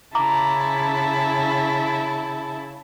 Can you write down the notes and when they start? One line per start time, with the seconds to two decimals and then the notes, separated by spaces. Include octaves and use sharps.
0.15 C#3 E4 A5 A#5 D6